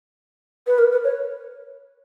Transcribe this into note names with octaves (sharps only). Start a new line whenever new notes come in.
B4
A#4
B4
C#5